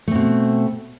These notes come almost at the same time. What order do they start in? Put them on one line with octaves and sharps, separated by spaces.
A3 C4 B2